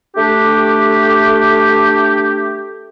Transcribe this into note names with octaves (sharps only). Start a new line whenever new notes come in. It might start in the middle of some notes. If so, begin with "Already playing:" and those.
A3 D4 G4